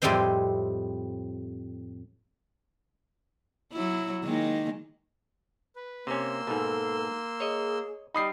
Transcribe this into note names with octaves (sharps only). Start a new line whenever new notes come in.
F2 A2 G3 G#3 C4 C5
F#3 E4
D#3 G#3 A#3
B4
C3 A#3 C#4 C6 E6
G#2 B2 A4
G#4 C#5 D#5
G3 D#4 D#5 B5 D#6 C7